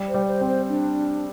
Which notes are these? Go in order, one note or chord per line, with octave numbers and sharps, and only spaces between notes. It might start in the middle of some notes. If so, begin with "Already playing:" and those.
Already playing: G3
C5
G3
C5
C4
C5
D4